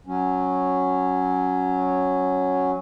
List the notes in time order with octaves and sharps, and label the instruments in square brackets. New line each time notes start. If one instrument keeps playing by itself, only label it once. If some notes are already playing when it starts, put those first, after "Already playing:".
[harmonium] F#3 C#4